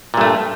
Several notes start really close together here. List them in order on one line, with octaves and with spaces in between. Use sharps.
A#2 G2 A3